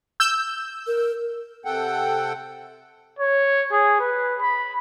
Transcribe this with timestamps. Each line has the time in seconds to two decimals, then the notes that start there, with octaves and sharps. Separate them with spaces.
0.20 E6 G6
0.87 A#4
1.65 C3 A4 F#5 G5
3.19 C#5
3.72 G#4
4.00 B4
4.41 B5